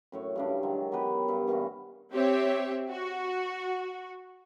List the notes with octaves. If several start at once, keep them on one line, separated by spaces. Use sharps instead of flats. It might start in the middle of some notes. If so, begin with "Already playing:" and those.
F#2 A2 C#5
G2 C#3 D4
D#3 F#3 G#3
F#3 B3 G4 B4
G2
G2 A#2 E3 F#4
C4 G4 C#5 E5
F#4